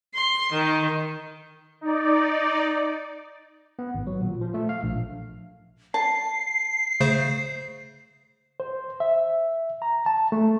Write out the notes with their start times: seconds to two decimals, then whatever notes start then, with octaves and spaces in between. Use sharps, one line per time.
0.14 C6
0.52 D#3
1.81 D#4 D5
3.79 B3
3.94 G#1
4.07 F#3
4.21 A#2
4.41 F3
4.54 A3
4.69 F5
4.83 A#1
5.94 A5 C7
7.00 C#3 A3 C5
8.60 C5
9.00 E5
9.82 A#5
10.06 A5
10.32 A3